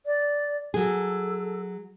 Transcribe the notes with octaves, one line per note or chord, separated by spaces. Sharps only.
D5
F#3 G#4 A4